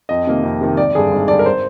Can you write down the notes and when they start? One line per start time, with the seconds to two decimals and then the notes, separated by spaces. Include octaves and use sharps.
0.09 F2 D#5
0.27 C3 D#3 A#3
0.43 F2
0.61 C3 D#3 A#3
0.77 G#1 D5
0.94 G2 D3 G#4
1.12 G#1
1.28 G2 D3 D5
1.39 A#4
1.46 C5